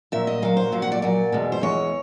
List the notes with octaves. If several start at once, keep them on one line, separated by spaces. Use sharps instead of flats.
A#2 F#3 E5
D#5
A#2 F#3 F5
C5
A#2 F#3 F5
F#5
D5
A#2 F#3 D5
E2 B2 G#3
C5
E2 B2 G#3 C#5